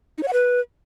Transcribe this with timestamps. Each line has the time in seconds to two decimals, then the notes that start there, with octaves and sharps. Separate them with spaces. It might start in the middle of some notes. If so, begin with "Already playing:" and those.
0.18 D#4
0.23 C#5
0.28 F#5
0.33 B4